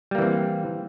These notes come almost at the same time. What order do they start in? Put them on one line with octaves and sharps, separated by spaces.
G3 A#3 E3 C4